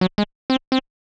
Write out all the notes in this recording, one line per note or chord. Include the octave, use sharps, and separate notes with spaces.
F#3
G#3
C4
C4